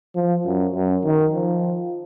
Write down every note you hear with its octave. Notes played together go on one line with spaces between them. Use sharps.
F3
F#2
F#2
D#3
F3